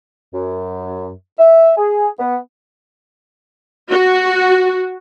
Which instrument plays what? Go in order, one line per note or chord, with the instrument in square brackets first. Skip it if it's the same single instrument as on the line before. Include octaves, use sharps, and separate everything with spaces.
[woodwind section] F#2
E5
G#4
B3
[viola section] F#4